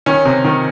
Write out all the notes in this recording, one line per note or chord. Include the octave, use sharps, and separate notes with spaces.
D#3 C#4
C3
D#3